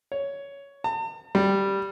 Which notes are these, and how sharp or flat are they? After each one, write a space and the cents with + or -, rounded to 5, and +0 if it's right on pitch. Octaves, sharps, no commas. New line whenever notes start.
C#5 +10
A5 +45
G3 +0